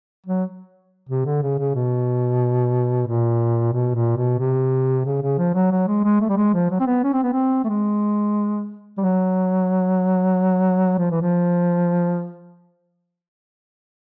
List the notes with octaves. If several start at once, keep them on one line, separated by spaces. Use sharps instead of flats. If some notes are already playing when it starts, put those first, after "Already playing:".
F#3
C3
D3
C#3
C#3
B2
A#2
B2
A#2
B2
C3
C#3
C#3
F3
F#3
F#3
G#3
G#3
A3
G3
G#3
F3
F#3
C4
B3
C#4
C4
B3
C4
A3
G#3
G3
F#3
F3
E3
F3